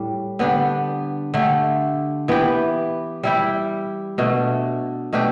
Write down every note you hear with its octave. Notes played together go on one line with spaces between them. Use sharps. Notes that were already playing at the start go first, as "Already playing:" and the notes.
Already playing: A2 G3
D3 B3 D4 G4
D3 A3 G4
E3 B3 G4
G3 E4 G4
B2 A3 D4
B2 A3 D4 G4